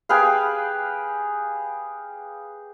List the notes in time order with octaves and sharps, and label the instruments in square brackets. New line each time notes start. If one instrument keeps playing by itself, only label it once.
[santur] G4 G#4 B4 F5